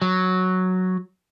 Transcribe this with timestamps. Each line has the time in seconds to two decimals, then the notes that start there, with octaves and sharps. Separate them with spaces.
0.02 F#3